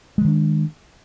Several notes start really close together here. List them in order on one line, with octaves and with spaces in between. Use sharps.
G#3 E3 D#3 D4